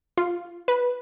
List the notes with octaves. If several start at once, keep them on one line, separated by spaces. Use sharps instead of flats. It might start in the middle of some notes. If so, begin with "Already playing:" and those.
F4
B4